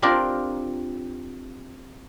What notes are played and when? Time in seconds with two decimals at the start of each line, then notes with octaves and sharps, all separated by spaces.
0.02 C4 D4 F4 G4 A#4